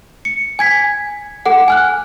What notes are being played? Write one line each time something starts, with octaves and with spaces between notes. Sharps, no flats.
C#7
G#5 G#6 B6
A4 F#5
G#5 F6 F#6